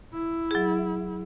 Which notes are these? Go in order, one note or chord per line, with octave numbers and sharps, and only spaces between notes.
E4
F#3 G#4